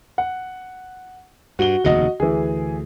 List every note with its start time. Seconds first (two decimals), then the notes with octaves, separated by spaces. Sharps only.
0.18 F#5
1.59 G2 F#4 G7
1.84 F1 D#2 C#3 F#4 D#5
2.20 D2 E3 G#4